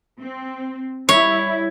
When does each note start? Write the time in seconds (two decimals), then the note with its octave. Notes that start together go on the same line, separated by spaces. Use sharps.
0.20 C4
1.09 G3 E4 C#5